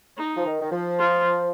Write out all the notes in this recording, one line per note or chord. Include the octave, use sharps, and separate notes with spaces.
D#4
F3
D#3
D#3
F3
F4